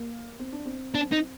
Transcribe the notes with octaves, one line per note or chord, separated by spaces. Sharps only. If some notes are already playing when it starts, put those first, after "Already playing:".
Already playing: A#3
C4
D4
C4
C4 D4
D#4